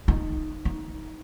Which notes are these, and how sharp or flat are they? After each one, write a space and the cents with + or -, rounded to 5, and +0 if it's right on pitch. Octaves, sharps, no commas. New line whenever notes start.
D#4 -5
D#4 +15